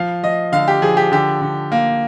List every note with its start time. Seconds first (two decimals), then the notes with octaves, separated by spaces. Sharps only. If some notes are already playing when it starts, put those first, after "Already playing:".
Already playing: F3 F5
0.23 F3 D#5
0.52 D3 F5
0.68 G4
0.82 F3 G#4
0.97 G4
1.12 D3 G4
1.41 D3
1.72 A#3